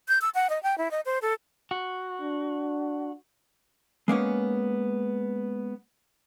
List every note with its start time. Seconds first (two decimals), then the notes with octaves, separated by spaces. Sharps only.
0.08 G6
0.21 E6
0.35 F#5
0.50 D#5
0.63 G5
0.78 E4
0.91 D#5
1.05 C5
1.22 A4
1.71 F#4
2.21 D4
4.08 G#3 A#3 B3 C#4